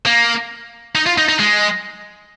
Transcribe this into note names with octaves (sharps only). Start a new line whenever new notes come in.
A#3
D#4
F4
D#4
D#4
G#3